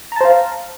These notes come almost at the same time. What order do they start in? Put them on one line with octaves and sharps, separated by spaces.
A#5 A5 C5 F5